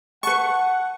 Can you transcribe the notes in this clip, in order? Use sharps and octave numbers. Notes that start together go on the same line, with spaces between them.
B4 F#5 A5 C#6